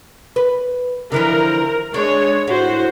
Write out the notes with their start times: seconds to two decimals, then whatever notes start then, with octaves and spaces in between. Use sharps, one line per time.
0.36 B4
1.12 D3 E3 F3 A#4
1.94 G#3 D4 C#5
2.48 A2 F#4 C5